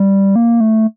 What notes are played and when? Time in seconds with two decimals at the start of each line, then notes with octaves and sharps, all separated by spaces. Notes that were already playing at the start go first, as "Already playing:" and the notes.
Already playing: G3
0.36 A#3
0.61 A3